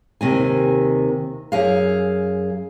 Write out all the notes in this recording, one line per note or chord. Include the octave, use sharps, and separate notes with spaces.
D#2 C3 D#3 G#5
F#2 G#4 F5